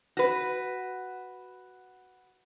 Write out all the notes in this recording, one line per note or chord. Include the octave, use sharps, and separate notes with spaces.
F#4 B4